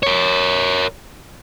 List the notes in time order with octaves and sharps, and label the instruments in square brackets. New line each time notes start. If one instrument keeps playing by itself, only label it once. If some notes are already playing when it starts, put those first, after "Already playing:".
[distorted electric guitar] A#4 C#5